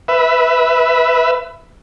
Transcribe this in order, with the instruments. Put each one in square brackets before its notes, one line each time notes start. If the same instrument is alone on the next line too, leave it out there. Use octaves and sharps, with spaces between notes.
[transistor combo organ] B4 E5